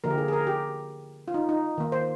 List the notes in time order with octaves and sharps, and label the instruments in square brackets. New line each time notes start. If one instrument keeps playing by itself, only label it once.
[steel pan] D3 F3 A#3 A#4
G4
G#4
G#4
A#4
G4
F4
D#4
D#4
D#3 A#3
C5